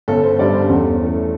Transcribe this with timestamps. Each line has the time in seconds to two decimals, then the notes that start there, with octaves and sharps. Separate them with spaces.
0.08 G1 A4
0.23 C5
0.39 G2 G3 D5
0.54 C5
0.69 E2 A4
1.01 E3 A3